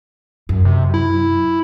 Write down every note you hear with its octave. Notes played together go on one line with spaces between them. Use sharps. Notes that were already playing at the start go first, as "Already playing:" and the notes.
F#2
C3
E4